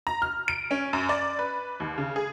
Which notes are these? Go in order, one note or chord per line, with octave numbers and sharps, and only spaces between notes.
A#5
F6
D7
C#4
F#2
D5
B4
D#2
C#3
G#4